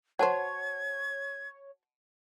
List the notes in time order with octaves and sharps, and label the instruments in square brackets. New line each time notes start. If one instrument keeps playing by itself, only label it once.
[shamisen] F#4 C5 [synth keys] C#5 [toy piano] F#5 A5 [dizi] G#6